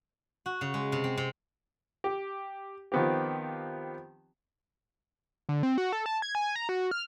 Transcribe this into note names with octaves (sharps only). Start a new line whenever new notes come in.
F#4
C#3
G#3
C3
C4
C3
G4
D#3 F3 B3 C4 G4
D3
C4
F#4
A4
A5
G#6
G#5
A#5
F#4
F6